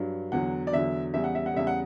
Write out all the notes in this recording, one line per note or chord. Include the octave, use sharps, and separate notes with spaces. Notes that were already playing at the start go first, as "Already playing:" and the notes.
Already playing: G2 F#3
E2 D3 F#3 F#5
D5
E2 D3 F#3 E5
E2 C#3 G3 E5
F#5
E5
F#5
E2 C#3 G3 E5
F#5